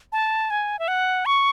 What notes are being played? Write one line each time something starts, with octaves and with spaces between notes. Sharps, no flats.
A5
G#5
E5
F#5
C#6